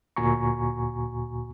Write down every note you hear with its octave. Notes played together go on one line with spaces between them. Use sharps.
D2 A#2 F#4 G#5 A#5 C#6